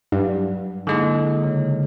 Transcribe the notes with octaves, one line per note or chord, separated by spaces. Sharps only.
G2 F#3
D3 G#3 A#3 D#4 E4
C#3